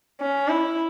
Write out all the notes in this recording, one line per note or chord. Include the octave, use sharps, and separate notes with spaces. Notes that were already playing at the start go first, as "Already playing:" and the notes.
C#4
E4